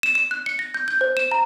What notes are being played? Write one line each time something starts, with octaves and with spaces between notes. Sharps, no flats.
E7
E7
F#6
C#7
A#6
G6
G6
C5
E7
A#5